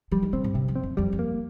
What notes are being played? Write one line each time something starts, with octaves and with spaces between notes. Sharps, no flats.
F3 G3
D#3
C3 C4
G#2
G2 C3
F2
C4
F2
F2 G3
F2
A#3